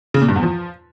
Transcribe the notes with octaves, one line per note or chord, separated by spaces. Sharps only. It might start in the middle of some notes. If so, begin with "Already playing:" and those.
C#3
A#2
G2
E2
F3